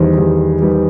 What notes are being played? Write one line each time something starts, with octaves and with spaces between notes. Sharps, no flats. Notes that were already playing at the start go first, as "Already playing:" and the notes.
Already playing: E2 D#3 G3 C5
E2 D#3 G3
D#3 G3 B4